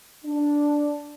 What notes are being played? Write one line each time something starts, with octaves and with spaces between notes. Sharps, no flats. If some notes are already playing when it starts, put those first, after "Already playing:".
D4